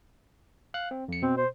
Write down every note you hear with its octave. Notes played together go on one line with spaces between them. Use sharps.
F5 F#6
C4
F2 C#7
B2 C4
C5